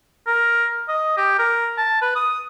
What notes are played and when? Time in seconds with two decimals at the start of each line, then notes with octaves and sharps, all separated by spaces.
0.27 A#4
0.88 D#5
1.17 G4
1.39 A#4
1.78 A5
2.02 B4
2.15 D#6